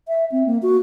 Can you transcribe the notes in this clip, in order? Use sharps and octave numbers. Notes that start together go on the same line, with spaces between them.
E5
C4
A#3
F#4